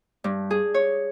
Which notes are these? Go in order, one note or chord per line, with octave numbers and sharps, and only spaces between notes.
G2
G#4
C#5